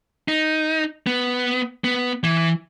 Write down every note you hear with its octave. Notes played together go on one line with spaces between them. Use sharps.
D#4
B3
B3
E3